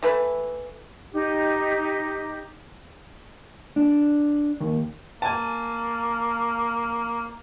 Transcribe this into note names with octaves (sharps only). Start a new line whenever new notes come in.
E3 A3 B4
D#4 G4
D4
D#2
A#3 G#5 A5